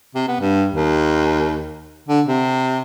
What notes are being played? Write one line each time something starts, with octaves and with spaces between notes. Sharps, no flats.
C3
B3
G2
D#2
D3
C3